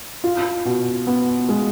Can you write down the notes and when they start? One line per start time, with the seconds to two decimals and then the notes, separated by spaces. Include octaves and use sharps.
0.24 F4
0.65 B2
1.07 B3
1.49 G#3